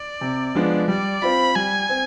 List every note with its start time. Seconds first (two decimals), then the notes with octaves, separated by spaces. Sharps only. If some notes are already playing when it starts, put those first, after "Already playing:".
Already playing: D5
0.21 C3
0.55 F3 G#3 B3 D4
0.88 G3 D5
1.22 C4 F4 B5
1.55 G3 G#5
1.89 C4